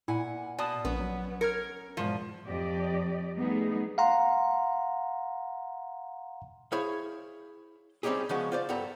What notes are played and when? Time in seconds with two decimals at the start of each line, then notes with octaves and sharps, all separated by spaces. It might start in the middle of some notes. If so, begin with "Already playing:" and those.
0.08 A#2 E4 F#5 G#5
0.59 B2 D5 A5 D#6
0.85 A#1 B3 C#4
1.00 F#3
1.41 A#4 F6 G#6 C#7
1.97 E2 G#2 B2 F3
2.47 F2 G4 D5 D#5
3.36 G3 A3 B3 D#4 G#4
3.98 F5 F#5 A#5 C6
6.72 E4 G#4 C5 C#5 F5
8.03 G3 C4 C#4 D#4 G4 G#4
8.29 C#3 F3 G#3 B3 C#4 F#4
8.52 F4 C5 D5
8.69 G2 B3 A4 A#5